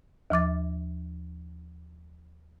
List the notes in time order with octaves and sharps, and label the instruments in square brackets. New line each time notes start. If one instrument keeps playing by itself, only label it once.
[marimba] D#2 F3 D6 A6